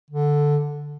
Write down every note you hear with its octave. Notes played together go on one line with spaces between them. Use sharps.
D3